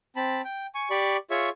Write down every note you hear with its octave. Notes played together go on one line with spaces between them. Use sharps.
C4 A5 B5
G5
G#5 C#6
G4 D5 B5 C#6
F4 G#4 C#5 E5 C#6